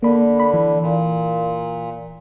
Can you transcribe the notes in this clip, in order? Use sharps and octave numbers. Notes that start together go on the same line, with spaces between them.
D3 A#3 B5
B5
E3
A#2